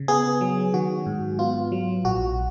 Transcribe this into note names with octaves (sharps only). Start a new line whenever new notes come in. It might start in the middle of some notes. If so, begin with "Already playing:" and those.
Already playing: C#3
B3 G#4
F#3
D#3 F#4
G#2
B3 F4
F#3
A#1 F#4